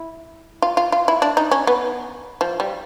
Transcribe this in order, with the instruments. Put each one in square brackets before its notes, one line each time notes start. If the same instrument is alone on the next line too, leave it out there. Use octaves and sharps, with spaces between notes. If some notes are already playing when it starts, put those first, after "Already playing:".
Already playing: [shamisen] E4
F4
F4
F4
E4
D4
D#4
C#4
B3
F3
G3